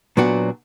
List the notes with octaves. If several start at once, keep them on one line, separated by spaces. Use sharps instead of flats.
A#2 F#3 B3 D4 F#4